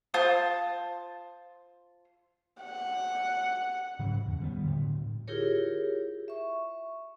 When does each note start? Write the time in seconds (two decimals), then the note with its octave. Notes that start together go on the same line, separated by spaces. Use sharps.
0.14 F4 C5 A5 D#6
2.62 F#5
3.99 G#2 C#3 E3 F#3
4.28 E2
4.40 D#3 G3 A3 B3
4.64 A2 D3
5.28 E4 F4 G4 G#4 A#4 C#5
6.28 E5 C#6